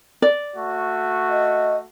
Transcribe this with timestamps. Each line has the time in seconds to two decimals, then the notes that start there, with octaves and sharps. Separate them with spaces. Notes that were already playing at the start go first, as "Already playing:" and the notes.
0.22 D5
0.55 A3 F#4
1.29 D#5